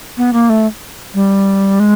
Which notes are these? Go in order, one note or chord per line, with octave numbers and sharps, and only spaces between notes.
B3
A#3
A3
G3
G#3